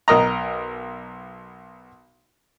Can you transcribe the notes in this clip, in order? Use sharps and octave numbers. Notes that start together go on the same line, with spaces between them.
B1 A#4 D#5 A#5